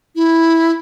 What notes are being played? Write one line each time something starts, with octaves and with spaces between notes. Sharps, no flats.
E4